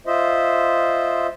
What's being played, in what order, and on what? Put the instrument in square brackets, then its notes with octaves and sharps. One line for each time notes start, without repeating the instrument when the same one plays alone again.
[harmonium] F4 C5 D#5 E5